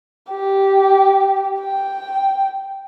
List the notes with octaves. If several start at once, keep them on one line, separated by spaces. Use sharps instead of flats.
G4
G5